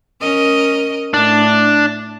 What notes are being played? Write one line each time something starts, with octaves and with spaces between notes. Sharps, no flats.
C#4 A#4 D#5
A2 D4